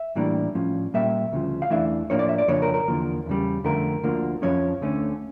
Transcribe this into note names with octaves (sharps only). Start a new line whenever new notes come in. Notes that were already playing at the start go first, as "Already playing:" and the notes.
Already playing: E5
A2 E3 G3 A#3 D4
A2 F3 C#4
A#2 G3 A#3 E5
D2 C#3 F3
F5
E2 E3 A3 D4 E5
A2 F3 A#3 D4 C#5
D5
E5
D5
F2 C#3 F3 A#3 D4 C#5
A#4
A#4
E2 D3 F3 A#3
E2 C#3 G3
F2 D3 A3 A#4
D2 D3 F3 A#3
F2 C#3 F3 C#4 C#5
D2 D3 A3 C#4